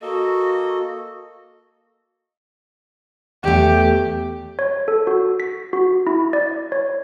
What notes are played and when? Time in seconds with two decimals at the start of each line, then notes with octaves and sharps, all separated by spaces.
0.02 A#3 F#4 A4 D#5
3.44 E2 A3 G4
4.59 C#5
4.88 A4
5.07 F#4
5.40 B6
5.73 F#4
6.07 E4
6.33 D5
6.72 C#5